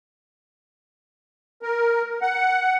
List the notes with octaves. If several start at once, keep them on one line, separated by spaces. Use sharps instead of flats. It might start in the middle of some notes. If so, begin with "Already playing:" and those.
A#4
F#5